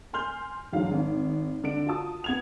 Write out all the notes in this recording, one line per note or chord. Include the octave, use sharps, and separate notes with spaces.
G#5 C6 F6 G6
G1 E2 G#2 F#3 F5
G#1
D3 D4 D7
F4 F#4 A5 D#6
B3 G#6 F7